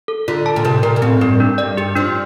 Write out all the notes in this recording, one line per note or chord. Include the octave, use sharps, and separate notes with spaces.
A4
D3 F4
A5
A#2
C3 A#4
A#2 A#4
A#2
A2 C4
G2 A#4
D4
G2 D5
G2 G4
F3 D4